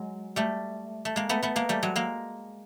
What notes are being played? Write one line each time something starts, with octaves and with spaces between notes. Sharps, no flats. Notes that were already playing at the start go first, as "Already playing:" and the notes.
Already playing: F#3 G#3
G3 A3
A3
G#3 A#3
A3 B3
A3 B3
G#3 A#3
G3 A3
F#3 G#3
G#3 A#3